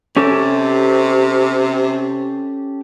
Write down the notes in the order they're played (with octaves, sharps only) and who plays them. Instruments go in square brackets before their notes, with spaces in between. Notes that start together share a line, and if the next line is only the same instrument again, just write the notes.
[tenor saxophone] C3 [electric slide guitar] C#4 G4 A4